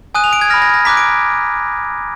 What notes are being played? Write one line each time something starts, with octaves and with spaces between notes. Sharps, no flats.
G#5 D#6 F#6 D#7
F7
D7
G#6
B5 F6 A#6
A#6
A#6
A#5 D6 F#6 B6
D7